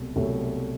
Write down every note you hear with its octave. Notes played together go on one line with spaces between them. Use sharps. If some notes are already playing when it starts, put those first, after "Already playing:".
Already playing: C2 B2 F#3 A3
C2 B2 F#3 A3